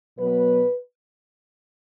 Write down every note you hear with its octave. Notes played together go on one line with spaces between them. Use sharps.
B2 F#3 B3 B4